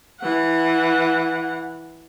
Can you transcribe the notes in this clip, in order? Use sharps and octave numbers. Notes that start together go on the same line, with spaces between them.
E3 F#5